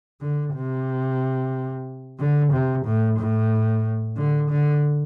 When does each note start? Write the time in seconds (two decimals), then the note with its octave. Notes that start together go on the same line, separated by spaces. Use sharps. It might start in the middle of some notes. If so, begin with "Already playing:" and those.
0.21 D3
0.54 C3
2.19 D3
2.52 C3
2.85 A2
3.19 A2
4.17 D3
4.50 D3